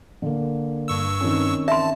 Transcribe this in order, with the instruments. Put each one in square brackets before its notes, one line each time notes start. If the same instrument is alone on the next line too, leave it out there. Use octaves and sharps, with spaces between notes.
[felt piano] D3 A#3
[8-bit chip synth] G2 C#6 E6
[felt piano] D#3 C4 C#4
[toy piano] E5 C6 [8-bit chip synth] A5